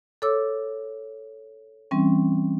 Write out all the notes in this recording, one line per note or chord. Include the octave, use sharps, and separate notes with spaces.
A4 C#5 D6 E6
E3 G3 C4 C#4